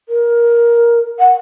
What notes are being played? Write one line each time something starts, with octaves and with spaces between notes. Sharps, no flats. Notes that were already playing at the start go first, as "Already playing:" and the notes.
A#4
F#5